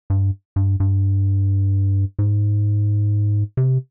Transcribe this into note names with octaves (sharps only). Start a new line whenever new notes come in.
G2
G2
G2
G#2
C3